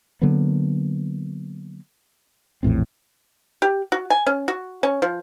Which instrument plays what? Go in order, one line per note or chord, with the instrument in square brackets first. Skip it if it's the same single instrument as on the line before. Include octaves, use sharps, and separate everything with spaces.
[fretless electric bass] D3 F#3 A#3 B3
A#1 E2 A2 C4
[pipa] G4
F#4
G#5
C#4
F#4
C#4
F3